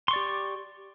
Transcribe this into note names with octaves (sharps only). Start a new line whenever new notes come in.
G4 D5 C6 C#6